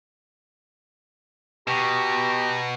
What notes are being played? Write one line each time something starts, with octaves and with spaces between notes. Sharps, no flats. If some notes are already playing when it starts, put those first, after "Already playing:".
B2 G4 A#5 C#6